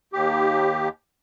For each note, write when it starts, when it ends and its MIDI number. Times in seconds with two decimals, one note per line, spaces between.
0.13 0.88 39
0.13 0.88 67